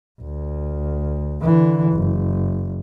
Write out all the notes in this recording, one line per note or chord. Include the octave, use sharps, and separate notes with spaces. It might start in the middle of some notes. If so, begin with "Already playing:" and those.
D2
D3 E3
F#1